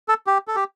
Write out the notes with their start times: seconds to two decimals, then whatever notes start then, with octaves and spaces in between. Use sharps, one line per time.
0.08 A4
0.27 G4
0.48 A4
0.56 G4